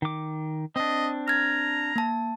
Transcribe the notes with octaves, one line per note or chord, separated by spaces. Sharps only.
D#3 D6
C4 D4 D#5
A#5 F6 G#6
A#3 A5